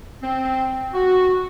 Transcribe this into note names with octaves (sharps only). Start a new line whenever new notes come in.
C4
F#4